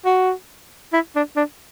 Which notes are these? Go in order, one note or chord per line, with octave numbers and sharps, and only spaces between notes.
F#4
E4
D4
D4